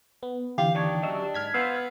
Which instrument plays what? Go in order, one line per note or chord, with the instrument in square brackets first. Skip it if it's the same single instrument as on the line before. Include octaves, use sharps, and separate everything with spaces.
[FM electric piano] B3
[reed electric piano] D3 E3 [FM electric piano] G4 [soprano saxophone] F5
[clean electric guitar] D#2 D#3 C#5 [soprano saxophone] D4
[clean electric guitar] F#3 C#4 E5 [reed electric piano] D#5
[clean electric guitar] G#2 [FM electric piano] F6 G#6 B6
[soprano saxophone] B3 [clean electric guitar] C5 F5 [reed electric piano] E6